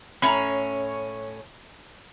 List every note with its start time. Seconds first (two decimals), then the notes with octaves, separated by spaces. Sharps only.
0.22 A2 C#4 A#5 B5